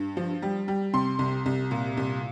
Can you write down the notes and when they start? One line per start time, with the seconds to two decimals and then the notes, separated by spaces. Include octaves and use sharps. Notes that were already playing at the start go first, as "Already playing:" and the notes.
Already playing: G2
0.17 F3
0.42 G3
0.68 G3
0.93 C3 C6
1.19 C2
1.46 C2
1.71 A#2
1.97 C2